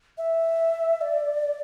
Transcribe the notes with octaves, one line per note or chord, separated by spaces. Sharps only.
E5
D5